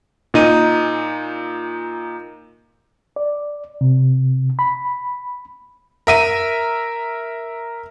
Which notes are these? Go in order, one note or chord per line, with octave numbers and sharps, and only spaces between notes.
A#2 D#4 D#7
D5
C3
B5
A#4 E5 D#7